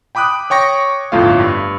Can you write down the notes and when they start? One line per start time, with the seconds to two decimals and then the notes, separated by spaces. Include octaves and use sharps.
0.15 G5 B5 D6 D#6 F#6
0.50 C#5 G5 C#6 A#6
1.12 G1 F2 A2 F4 F5
1.40 G2